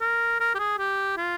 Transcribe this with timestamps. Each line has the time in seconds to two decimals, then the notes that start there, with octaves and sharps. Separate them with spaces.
0.01 A#4
0.40 A#4
0.55 G4
0.59 G#4
0.78 G4
1.17 F4